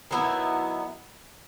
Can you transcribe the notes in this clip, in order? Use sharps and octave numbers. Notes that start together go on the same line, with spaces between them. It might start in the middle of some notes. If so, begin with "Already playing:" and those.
D#3 F#3 B3 E4